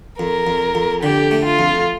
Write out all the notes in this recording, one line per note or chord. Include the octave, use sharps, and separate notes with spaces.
F2 A#4
F2
F2
D3 G4
A3
F4
F2